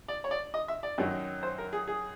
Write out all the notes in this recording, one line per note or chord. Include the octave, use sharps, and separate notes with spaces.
D5
C#5
D5
D#5
E5
D5
F#2 D#3 F#3
C5
A#4
G#4
G#4